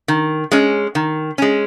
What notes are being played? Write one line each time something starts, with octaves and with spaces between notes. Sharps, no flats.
D#3
G#3 C#4
D#3
G#3 C#4